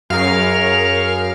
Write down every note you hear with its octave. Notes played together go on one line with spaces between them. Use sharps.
F#2 G#4 A#4 C#5 F5 F6